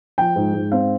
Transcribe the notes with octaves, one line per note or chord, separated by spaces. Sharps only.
F3 G5
G#2
G#2
C4 F5